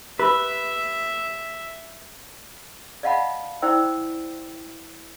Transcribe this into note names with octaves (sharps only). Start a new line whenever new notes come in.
G4 B4 E5 B5 E6
D5 D#5 F5 F#5 A5 B5
E4 C5 D5 G5 E6